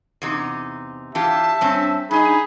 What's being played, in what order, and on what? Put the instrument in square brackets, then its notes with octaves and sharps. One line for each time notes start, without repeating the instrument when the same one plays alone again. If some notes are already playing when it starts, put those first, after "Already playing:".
[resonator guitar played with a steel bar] E2 C3 D#4
[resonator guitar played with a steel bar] E3 F4 G4 [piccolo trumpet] E5 [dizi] A5
[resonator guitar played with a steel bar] G2 C4 C#4
[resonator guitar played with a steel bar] G2 D#5 [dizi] D#4 [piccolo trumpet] G#4 [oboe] B5